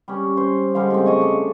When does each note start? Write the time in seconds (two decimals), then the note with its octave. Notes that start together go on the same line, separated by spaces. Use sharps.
0.08 G3 C#4
0.37 C5
0.75 D3 G3 G#3 F5
0.90 A2 C#3 C4
1.06 A3 D#5 G#5 C#6
1.21 D4